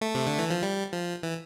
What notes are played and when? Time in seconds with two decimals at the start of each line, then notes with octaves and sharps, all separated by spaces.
0.01 A3
0.14 C3
0.27 D3
0.38 E3
0.50 F3
0.62 G3
0.93 F3
1.23 E3